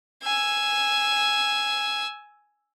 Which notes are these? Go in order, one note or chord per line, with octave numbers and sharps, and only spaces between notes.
G#5 E6